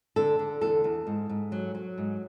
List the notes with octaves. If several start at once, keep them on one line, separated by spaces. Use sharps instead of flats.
D3 A4
D3
E2 A4
E2
G#2
G#2
F#3
F#3
G#2